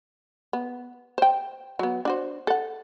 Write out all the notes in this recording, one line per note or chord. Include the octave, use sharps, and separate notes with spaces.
B3
C5 G5
F#3 B3
D4 F#4 C5
A4 F#5